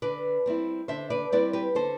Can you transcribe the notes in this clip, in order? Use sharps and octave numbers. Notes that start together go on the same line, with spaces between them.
D3 B4 D5
G3 C4 E4
D3 C5 E5
B4 D5
G3 C4 E4 B4 D5
G4 B4
D3 A4 C5